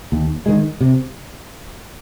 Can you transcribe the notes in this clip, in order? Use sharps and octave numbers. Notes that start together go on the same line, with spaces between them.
D#2
D#3 G#3
C3